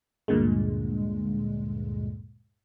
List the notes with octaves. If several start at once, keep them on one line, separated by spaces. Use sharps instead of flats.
D2 G2 A#2 D3 G#3